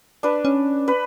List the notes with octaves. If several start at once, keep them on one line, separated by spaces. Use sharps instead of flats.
D4 B4
C#4
B4